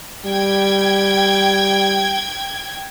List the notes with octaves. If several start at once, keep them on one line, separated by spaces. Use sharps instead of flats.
G3 G5 G#6